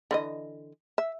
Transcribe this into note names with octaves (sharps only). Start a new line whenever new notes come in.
D3 E3 D#5
E5